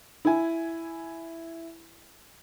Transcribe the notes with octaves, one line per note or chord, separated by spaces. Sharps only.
E4 G#5